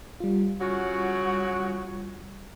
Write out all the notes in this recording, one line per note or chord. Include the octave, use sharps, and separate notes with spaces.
G3 F4
C#3 F#3 F#4